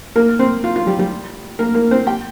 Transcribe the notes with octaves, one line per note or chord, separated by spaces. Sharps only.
A#3 A#4
C4 C5
F4
F4
G3 G4
G3 G4
A#3 A#4
A#3 A#4
C4 C5
G4 G5